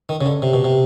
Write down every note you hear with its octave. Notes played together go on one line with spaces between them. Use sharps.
D#3
C#3
D3
C3
B2
C3